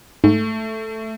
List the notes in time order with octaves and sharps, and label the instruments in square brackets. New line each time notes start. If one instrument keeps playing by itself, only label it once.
[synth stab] G#2 [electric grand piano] A3